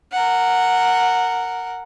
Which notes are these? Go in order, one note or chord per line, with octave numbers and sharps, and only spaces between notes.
A#4 F#5